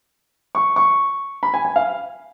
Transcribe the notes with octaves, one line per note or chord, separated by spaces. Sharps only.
C#6
C#6
B5
G#5
G#5
F5